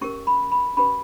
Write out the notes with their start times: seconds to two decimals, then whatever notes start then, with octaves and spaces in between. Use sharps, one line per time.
0.01 C#4 G4 A#4 C#6
0.27 B5
0.52 B5
0.77 C#4 G4 B4 B5